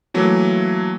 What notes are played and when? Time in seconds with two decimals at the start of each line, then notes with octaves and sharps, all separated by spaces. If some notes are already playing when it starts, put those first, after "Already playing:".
0.14 E3 F#3 A3 A#3